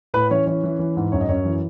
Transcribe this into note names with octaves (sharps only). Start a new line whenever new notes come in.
A2 B4 B5
E3 C#4 C#5
E3 C#4 C#5
E3
E3
G#2
F#2 C#5
D#5
F#2 C#4 C#5
E3